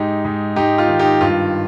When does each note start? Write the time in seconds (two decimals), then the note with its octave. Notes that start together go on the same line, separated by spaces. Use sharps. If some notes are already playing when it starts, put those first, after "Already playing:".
Already playing: G#2 D#4 G4
0.25 G#2
0.56 G#2 D#4 G4
0.78 F4
0.88 D#3
0.99 D#4 G4
1.21 G2 F4